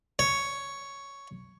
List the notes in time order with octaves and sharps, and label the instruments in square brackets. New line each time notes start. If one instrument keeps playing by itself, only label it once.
[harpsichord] C#5